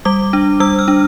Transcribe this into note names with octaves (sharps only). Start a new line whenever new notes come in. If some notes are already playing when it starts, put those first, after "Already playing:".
G3 D6
D4
G3 E6
F6
D4